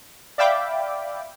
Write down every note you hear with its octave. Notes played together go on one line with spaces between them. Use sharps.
D5 E5 F5 G5 B5 D6